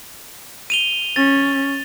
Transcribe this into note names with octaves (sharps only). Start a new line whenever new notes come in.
D#7 F7 G7
C#4 A6